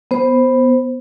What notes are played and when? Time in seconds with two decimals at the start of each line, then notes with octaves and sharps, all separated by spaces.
0.11 B3 C5